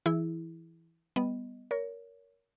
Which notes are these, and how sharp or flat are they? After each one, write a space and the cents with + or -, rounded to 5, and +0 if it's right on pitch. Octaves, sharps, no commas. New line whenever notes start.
E3 +10 E4 -10 G#4 +15
G3 +0 B3 +0 D#5 +0
A#4 +5 C#5 +25